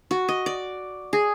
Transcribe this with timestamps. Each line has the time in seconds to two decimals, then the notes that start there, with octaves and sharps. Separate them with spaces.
0.11 F#4
0.29 D#5
0.46 D5
1.13 G#4